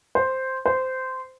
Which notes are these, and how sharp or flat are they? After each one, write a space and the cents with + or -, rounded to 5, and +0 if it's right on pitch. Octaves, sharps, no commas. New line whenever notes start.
C5 +0
C5 -15